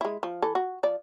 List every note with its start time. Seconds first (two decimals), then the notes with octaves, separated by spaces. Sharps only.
0.01 G#3 E4
0.23 F3
0.42 E3 A4
0.55 F#4
0.83 F3 D5